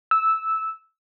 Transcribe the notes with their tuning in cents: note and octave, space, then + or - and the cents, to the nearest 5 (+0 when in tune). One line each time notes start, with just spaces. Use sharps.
E6 -10